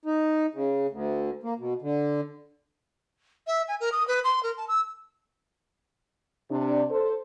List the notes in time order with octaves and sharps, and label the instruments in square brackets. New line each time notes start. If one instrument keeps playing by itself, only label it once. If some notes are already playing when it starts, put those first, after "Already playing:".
[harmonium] D#4
C#3
D2
A#3
B2
D3
[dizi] E5
G#5
A#4
D#6
B4
C6
A#4
A5
E6
[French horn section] C3 D4
A4 C5